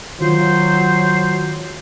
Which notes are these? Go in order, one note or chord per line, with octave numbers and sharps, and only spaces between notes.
D#3 F#3 F4 C5